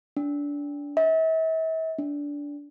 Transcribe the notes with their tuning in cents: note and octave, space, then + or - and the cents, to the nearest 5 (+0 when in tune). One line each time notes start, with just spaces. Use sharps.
D4 -25
E5 -40
D4 -20